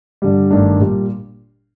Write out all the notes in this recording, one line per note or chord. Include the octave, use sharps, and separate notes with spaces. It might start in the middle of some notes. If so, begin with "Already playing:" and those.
G2 D3 G3
G1 G2 D#3 A3 D4
A#2 G3